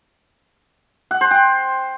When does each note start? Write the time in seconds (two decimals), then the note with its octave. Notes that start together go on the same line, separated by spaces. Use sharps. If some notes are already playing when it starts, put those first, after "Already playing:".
1.11 F#5
1.21 C5
1.31 G5